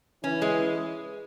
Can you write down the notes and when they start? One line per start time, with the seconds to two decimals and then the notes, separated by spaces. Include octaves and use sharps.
0.23 E3 C#4
0.42 G#3